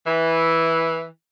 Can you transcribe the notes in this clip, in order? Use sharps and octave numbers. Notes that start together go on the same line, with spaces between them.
E3